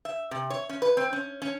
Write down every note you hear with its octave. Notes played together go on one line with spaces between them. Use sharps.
E5
C3
C#5
C#4
B4
C4
C#4
C#4